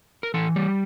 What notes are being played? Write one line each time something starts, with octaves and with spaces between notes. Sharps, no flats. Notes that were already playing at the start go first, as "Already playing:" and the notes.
A#4
E3 A4
G3